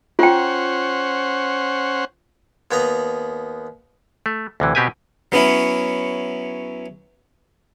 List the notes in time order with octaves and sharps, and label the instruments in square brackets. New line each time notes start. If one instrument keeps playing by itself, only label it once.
[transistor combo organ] C#4 C5 F#5 [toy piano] F4 G5
[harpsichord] D#2 B3 B4 A#5
[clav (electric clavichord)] A3
D2 C3 E3
B2 C4 G4 B4 G#5
[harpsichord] F#3 B3 C#4 E4